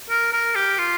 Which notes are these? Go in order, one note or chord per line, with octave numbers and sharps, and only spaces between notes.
A#4
A#4
G4
F4